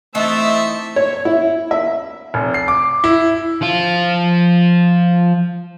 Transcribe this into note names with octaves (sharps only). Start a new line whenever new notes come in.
E3 A3 C4 D#4 E5 A5
C#5
E4
E5
F1
C7
D6
E4
F3 F4